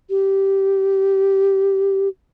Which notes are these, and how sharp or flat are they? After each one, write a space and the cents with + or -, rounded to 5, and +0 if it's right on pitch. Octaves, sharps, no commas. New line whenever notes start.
G4 -10